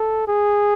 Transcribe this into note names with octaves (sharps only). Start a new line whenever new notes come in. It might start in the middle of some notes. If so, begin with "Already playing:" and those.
Already playing: A4
G#4